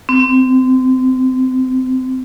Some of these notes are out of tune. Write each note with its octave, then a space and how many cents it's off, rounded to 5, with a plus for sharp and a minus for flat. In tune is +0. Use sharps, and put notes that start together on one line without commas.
C4 -25